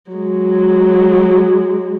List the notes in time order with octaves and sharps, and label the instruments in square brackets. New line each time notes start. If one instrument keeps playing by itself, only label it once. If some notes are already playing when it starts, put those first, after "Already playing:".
[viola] F#3 G#3